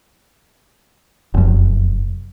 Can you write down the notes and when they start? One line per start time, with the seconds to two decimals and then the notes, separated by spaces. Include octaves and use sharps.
1.34 F1 F#2